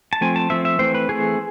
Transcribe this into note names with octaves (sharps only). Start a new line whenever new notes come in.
A5
F3 A3 C4 G#5
A5
F3 A3 C4 E5
E5
E3 A3 C4 C5
B4
E3 A3 C4 G#4